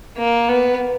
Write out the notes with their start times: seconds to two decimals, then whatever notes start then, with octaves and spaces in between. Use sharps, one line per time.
0.17 A#3
0.49 B3